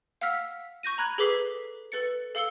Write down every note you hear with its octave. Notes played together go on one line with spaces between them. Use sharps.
F5 F#5 E6 F6 B6
C#6 G6 A#6 D#7
A#5 B5 F#6 G#6
G#4 A4 B4 D6 B6 C7
A4 B4 A6 C#7
A4 F5 E6 C#7 G7